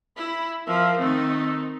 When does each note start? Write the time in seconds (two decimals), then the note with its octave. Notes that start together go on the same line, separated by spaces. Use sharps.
0.17 E4 B5
0.67 F3 A#4 E5
0.99 D#3 A3 C4 D#4